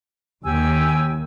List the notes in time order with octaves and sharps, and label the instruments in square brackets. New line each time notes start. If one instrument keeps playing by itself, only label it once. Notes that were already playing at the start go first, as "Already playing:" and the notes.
[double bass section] D#2 [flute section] G4 G#5 E6